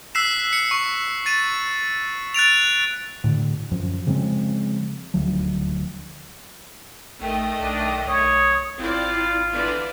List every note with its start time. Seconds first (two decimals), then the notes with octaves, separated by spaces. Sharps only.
0.15 E6 F#6 B6 C7 E7
0.53 C#7
0.71 C#6
1.26 A6 D#7 E7
2.34 F#6 A6 D7 F7
3.24 A2 D3
3.71 F#2 F3
4.07 C#3 F3 G#3 C4
5.14 D#1 D2 F3 F#3
7.21 A1 D#3 A3 D#5 G5
7.60 B1 D4
8.07 B1 C#5 D#6
8.79 G#1 C4 E4 F4 D5
9.54 D3 E3 D5